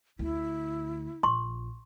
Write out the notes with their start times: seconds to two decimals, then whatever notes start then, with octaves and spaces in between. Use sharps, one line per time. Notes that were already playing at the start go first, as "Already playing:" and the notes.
0.19 D2 E4
1.23 A#1 C6 C#6